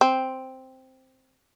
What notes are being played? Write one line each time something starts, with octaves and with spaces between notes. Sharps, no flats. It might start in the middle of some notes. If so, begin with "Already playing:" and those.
C4